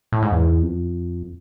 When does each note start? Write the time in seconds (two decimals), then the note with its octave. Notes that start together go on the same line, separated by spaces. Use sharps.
0.12 A2
0.22 G#2
0.32 E2
0.61 F2